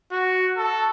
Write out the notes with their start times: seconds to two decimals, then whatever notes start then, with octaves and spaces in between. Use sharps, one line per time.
0.12 F#4
0.57 A4